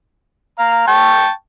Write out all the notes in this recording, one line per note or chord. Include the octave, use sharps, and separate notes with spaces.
F5 A#5
G5 A5 C#6